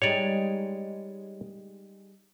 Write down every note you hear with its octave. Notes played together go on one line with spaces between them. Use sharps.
G3 G#3 D#4 C#5 D5